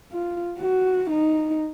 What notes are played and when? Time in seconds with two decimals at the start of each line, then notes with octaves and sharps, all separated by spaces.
0.12 F4
0.59 F#4
1.10 D#4